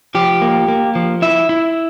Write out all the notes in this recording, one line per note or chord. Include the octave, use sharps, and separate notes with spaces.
F3 G4
A#3
A#3
F3
E4 E5
E4